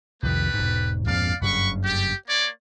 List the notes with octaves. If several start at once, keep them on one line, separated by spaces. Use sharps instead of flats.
C2 F2 D#3 A3 G4 B4
E1 G#2
A#1 F2 G#2 D5 F5
F#1 G2 C#3 F#5 B5 C#6
A3 G4
A#3 C#5 D5